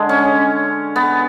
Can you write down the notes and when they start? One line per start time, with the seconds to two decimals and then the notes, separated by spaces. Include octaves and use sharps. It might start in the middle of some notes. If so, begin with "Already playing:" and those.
Already playing: D3 G#3
0.09 C#4
0.96 B3